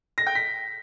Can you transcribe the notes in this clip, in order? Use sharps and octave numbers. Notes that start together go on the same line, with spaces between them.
A#6
G5
B6